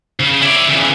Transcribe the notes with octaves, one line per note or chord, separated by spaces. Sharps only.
C#3
E4 D5
C#3 E3